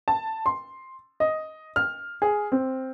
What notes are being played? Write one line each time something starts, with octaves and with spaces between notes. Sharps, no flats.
A5
C6
D#5
F6
G#4
C4